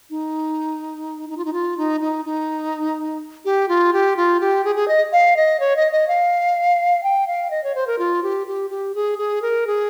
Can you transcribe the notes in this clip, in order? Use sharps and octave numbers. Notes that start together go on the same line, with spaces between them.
D#4
D#4
F4
D#4
F4
D#4
D#4
D#4
G4
F4
G4
F4
G4
G#4
G#4
D#5
F5
D#5
C#5
D#5
D#5
F5
G5
F5
D#5
C#5
C5
A#4
F4
G4
G4
G4
G#4
G#4
A#4
G#4